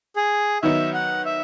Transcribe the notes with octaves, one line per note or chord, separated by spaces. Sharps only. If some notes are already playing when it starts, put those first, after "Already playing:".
G#4
D#3 F#3 B3 D#4 E5
F#5
E5